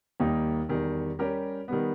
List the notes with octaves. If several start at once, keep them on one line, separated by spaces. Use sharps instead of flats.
D#2 D#3 G3 A#3 D#4
E2 D#3 G3
G3 C#4 G4 A#4
D#3 G3 B3